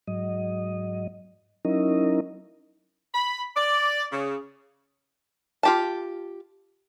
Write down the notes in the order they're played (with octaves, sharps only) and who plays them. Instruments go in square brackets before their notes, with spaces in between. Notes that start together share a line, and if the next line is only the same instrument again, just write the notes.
[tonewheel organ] G#2 F#3 D#5
F#3 C#4 D#4 E4 A#4 D#5
[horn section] B5
D5
C#3
[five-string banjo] F4 G4 A5